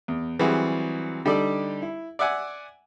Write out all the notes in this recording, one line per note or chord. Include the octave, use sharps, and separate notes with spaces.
E2
E3 F#3 G3 C4 F#4 G#4
D3 G3 D#4 G4 A4 D5
E4
D5 E5 F#5 G#5